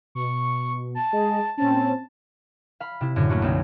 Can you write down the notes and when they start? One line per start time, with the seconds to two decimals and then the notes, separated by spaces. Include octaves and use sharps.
0.15 B2 C#6
0.95 A5
1.12 G#3 G#4 D#5
1.57 A#2 C4 C#4 A5
2.80 F5 B5
3.01 C3 E4
3.16 F#2 A2 D3
3.29 A3 A#3 C#4 D4 F#4
3.42 B1 C4